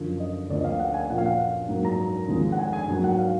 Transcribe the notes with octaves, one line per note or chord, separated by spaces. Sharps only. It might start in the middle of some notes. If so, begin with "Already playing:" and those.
Already playing: F#2 D3 F3
D#5
D2 D3 F3 A#3 D5
D#5
F5
F#5
G#5
A#2 F3 A#3 F#5
F5
F#5
G#2 F#3 A#3
A#5
D#2 D3 F3 G#3
F#5
G#5
G#5
G#2 F#3 A#3 G#5
F#5
F5